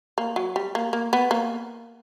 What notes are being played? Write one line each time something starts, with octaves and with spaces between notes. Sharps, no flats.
A#3
F#3
G3
A#3
A#3
B3
A#3